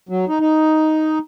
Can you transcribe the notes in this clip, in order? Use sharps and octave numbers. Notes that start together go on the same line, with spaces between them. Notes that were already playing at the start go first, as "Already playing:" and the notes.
F#3
D#4
D#4